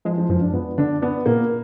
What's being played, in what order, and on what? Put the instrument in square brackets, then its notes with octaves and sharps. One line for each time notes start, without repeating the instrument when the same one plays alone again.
[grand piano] F3 [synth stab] G#3
[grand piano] F3
[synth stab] F#2 [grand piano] F3
[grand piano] D4
[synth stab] F#2 [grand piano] B3
[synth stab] D3 [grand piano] D4
[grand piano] B3 [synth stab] D4
[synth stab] A#2 [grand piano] A#3